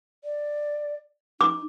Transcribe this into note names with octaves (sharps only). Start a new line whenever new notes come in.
D5
D#4 D6